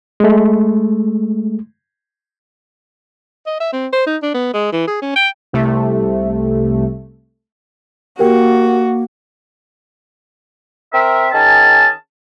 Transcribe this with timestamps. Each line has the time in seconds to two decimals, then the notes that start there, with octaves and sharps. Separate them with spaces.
0.20 G#3 A3
3.47 D#5
3.60 E5
3.73 C4
3.93 C5
4.07 D#4
4.22 D4
4.34 B3
4.54 G#3
4.72 E3
4.87 G#4
5.02 C#4
5.16 G5
5.53 C2 C3 A3
8.19 A#3 F#4 G4 A#4 G5
10.93 C4 A#4 E5
11.32 D#3 C#4 G#4 A5